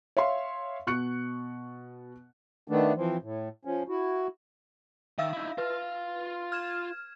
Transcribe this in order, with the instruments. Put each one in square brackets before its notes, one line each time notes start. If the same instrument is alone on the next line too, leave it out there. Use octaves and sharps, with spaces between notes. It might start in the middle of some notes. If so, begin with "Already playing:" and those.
[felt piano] C#5 E5 F5 C6
B2 C#6 F#6 C#7
[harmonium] D#3 A3 B3 D4
E3 F3 C4
A2
F3 C#4
E4 F#4
[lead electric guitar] D#3 [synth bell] E5 F5 E6
[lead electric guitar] D#4 E4
[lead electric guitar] F4 F5 [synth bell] B4
[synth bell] F6 G#6 E7